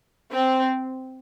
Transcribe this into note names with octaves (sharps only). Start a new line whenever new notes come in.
C4